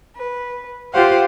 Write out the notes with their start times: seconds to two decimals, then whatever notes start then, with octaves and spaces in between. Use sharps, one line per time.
0.15 B4
0.93 F4 G4 C5 F5 F#5